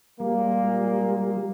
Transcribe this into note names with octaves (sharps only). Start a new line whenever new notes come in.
A#2 G3 G#3 A#3